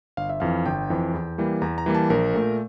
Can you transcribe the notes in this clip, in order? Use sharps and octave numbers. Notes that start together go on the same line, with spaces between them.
G1 F5
E5
F2 E3 F5
G1 G5
F2 E3
E2
E3 G3 A#3
E2 A#5
A#5
E3 G3 A#3
A5
A#1 A#4
A#2 A3